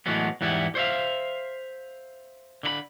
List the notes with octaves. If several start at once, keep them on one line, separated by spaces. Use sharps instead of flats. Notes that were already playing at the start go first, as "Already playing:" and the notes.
A2 E3 F#3 G#3 B3
E2 G#2 E3 G3 B3 E4
C5 C#5 E5 F5
D3 E4 B5